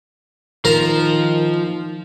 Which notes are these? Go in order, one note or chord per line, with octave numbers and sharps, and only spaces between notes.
D#3 F3 A#4 A#5